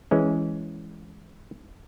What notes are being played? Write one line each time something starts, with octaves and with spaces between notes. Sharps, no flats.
E3 G#3 C#4